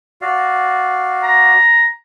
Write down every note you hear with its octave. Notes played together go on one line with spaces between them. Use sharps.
F#4 D5 F5
A#5